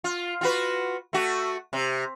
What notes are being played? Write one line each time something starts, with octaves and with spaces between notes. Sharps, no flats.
F4
F4 F#4 B4
A3 F#4
C3